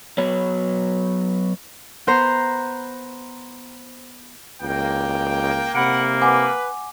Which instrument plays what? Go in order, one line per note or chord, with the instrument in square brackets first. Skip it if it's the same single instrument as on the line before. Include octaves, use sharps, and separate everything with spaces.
[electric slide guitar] F#3 B3 C#5
[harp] B3 C5 A#5 C7
[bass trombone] C#2 [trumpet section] A#3 G5
[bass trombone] C3 [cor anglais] A#3 [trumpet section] F#5 [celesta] B5 C#7 D7
[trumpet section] B4 [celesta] F#5 G#5 D6